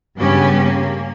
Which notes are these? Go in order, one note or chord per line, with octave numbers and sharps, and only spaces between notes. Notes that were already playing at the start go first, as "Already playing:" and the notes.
G2 C#3 B3 C#4 G4
A#3